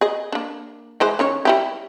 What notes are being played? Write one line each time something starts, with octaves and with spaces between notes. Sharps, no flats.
G#4 D#5
A#3 D4
E3 G#3 C5
D#3 C#4 C#5
G3 E4 G4